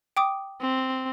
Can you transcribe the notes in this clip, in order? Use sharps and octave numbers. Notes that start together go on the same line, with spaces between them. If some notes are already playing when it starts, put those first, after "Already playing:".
G5 D6 D#6
C4